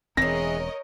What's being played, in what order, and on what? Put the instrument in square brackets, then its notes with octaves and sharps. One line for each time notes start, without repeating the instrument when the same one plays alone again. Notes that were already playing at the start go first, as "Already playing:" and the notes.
[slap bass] E1 C4 [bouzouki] E3 G#3 [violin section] A#4 C#5 D#5 [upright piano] A#6